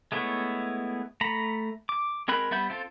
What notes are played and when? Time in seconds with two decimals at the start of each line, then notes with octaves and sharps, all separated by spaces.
0.12 G#3 A3 B3 E4 C#5
1.21 A3 A#5 B5
1.89 D6
2.28 G#3 C4 A#4 B5 F#6
2.51 G3 B3 E5 B5 G6
2.70 C4 F4 A4 C5